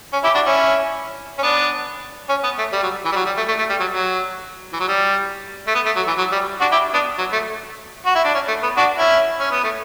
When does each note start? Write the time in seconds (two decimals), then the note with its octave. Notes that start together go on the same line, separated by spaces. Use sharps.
0.13 C#4
0.24 E4 G4
0.34 D4 F#4
0.45 C#4 E4
1.39 C#4
1.43 B3 D4
2.29 C#4
2.44 B3
2.58 A3
2.73 G3
2.83 F#3
3.05 E3
3.12 G3
3.16 F#3
3.26 G3
3.37 A3
3.48 A3
3.59 A3
3.70 G3
3.80 F#3
3.91 F#3
4.73 E3
4.80 F#3
4.88 G3
5.67 A3
5.75 B3
5.86 A3
5.96 F#3
6.07 E3
6.18 F#3
6.32 G3
6.61 D4 F#4
6.72 E4 G4
6.94 B3 D4
7.18 F#3
7.33 A3
8.06 F#4
8.15 E4
8.24 D4
8.34 C#4
8.48 A3
8.63 B3
8.77 D4 F#4
8.98 C#4 E4
9.39 C#4
9.52 B3
9.64 A3